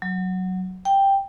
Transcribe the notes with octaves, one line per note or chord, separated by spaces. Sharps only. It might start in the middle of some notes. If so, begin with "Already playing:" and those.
F#3
G5